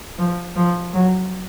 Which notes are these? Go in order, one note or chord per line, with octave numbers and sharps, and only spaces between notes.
F3
F3
F#3